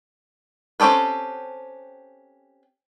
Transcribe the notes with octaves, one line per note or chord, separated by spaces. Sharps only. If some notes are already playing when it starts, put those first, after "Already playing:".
C4 C#4 G4 A4 B4